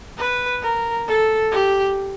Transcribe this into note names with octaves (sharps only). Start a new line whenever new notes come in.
B4
A#4
A4
G4